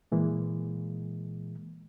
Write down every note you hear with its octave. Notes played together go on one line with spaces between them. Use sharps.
A#2 E3 G#3 A#3